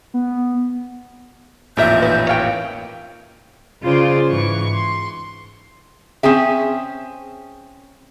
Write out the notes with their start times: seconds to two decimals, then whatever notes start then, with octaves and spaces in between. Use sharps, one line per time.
0.14 B3
1.77 A1 F2 A#2 D#4 A#4 E5 G6
2.02 D#4 E4 B4
2.29 C#5 F5 G5 F#6
3.82 C#3 F4 G#4 C5 D5
4.28 G#2 E3 C#6
4.74 C6
6.23 C4 C#4 G#4 E5